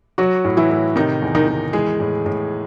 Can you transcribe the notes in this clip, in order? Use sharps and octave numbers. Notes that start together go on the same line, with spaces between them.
F#3 F#4
A2
E3 E4
A2
C3 D#3 D#4
E2
D#3 D#4
D#3
E3 G#3 G#4
A2
A2